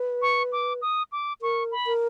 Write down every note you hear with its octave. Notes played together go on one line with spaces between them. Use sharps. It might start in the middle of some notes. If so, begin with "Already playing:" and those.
Already playing: B4
C#6
D6
D#6
D6
A#4 C#6
B5
A#4